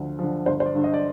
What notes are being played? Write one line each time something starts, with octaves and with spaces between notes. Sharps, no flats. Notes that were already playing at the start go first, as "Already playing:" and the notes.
Already playing: D2 D3 F3
D3 F3
G1 C5
C5
D5
G2 D3
D#5
D5